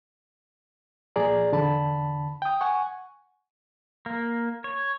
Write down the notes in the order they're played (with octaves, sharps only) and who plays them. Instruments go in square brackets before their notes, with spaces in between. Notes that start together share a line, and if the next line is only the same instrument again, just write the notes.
[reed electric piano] A#2 F3 G#4 D5 A#5
E2 D3 A5 B5
G5 D#6
F#5 G#5 C#6
[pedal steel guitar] A#3
C#5